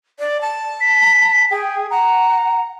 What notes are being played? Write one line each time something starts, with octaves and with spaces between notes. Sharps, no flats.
D5
A5
B6
G#4 G5
F#5 A#5